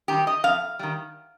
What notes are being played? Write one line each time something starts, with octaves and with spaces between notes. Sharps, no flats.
D#3 G3 G4
D#5
F2 F5
D#3 G3